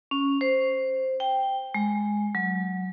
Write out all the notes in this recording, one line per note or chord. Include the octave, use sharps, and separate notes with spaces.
C#4
C5
G5
G#3
F#3